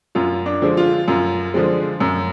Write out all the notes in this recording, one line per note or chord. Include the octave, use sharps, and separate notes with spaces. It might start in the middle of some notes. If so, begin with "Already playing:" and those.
F#2 F4
D4
D3 F3 G#3
F4
F#2 F4
D3 F3 G#3
F#2